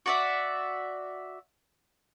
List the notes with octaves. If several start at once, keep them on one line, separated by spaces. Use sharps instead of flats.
F#4 D5 E5